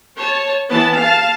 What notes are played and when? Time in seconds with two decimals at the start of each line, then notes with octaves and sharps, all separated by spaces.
0.15 C#5 A5
0.68 E3 B3 A5
0.98 F5 A5